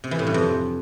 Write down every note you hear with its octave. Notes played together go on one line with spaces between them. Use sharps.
C3
E3
A2
G2
F2